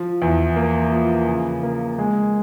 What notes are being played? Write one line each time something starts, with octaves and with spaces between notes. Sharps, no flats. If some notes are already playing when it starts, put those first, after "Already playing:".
Already playing: F3
E2
A#3
F3
C#3
A#3
G#3